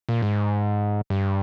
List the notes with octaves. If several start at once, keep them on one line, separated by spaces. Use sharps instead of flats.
A#2
G#2
G2